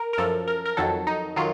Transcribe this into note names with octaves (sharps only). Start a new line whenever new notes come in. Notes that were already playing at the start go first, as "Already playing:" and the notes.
Already playing: A#4
A#4
F#2 F3 A4
A#4
A#4
F2 D#3 F#3 A4
D#4
D#3 F#3 F4